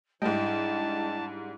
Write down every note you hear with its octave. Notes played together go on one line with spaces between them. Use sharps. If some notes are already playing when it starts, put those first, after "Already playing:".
G#2 G3 D4 E4 D#5 G5 A5